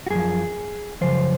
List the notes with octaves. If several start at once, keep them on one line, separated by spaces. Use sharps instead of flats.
F#4
F#2 F3 G#4
F#2 C#3 F3 C5